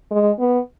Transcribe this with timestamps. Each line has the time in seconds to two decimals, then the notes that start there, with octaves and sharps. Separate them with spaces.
0.11 G#3
0.39 B3